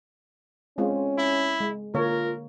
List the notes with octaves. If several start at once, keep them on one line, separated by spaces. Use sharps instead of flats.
G#3 C4 C#4 F4
E4
G#3
D3 A#3 F4 A#4 C#5